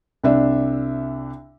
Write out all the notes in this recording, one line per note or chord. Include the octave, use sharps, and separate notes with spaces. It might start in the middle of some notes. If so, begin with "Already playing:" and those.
C2 D4 E5